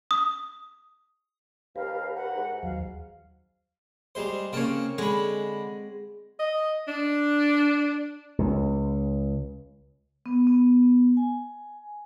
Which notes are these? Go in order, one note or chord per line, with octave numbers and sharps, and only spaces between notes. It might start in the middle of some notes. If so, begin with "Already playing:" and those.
D#6
D#2 G4 A#4 B4 F5
F#5
G#2
D#2 F#3 F5
G3 G#3 C5
C#3 A#3 C4 C#5 A5
D3 G#3 B5
D#5
D4
C#2
B3
B3
G#5